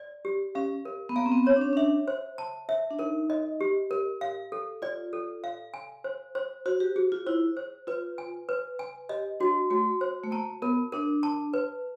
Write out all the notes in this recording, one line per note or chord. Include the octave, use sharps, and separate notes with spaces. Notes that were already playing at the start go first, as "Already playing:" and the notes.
Already playing: D5
G4
C#4 F5
A#4
B3
A#3 F5
C4
B3
C4 C#5
D4
C#4
C#4
D4 E5
C5
A5
E5
D4
D#4 A#4
D#5
G4
A#4
F5
A4
F4 D5
A4
F5
G#5
C5
C5
F#4 C5
G4
F#4 G#4
F4
E4 C5
C5
F4 B4
G#5
B4
G#5
G4 D#5
D4 F#4
A3 F#4
C5
A3
A#3 A5
B3 A#4
D4 A#4
A5
B4